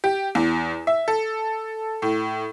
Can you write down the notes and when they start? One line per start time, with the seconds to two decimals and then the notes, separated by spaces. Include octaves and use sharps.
0.04 G4
0.35 E2
0.87 E5
1.08 A4
2.02 A2